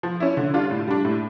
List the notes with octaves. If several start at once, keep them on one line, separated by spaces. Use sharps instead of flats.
F3
C#4 E4
D3
G3 D4 F4
A2
G3 D4
A2